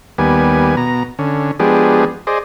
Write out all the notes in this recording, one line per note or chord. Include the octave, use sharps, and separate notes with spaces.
D#2 G3 B3 G#5
B2 A#5
D3 C#4
F3 G#3 B3 D4 G4 G#4
G#4 C5 D5 D#5